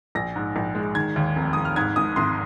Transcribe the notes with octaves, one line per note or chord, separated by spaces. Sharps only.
A#1 A#6
G#2
A#1
G#3
D#3 G#6
D#2
F1
F1 D#6
F6
G#2 G#6
G#1 D#6
G#1 C6